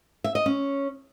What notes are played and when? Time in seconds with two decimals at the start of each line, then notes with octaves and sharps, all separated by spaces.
0.24 E5
0.35 D#5
0.46 C#4